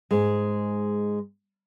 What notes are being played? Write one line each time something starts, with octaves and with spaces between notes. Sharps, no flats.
G#2 G#3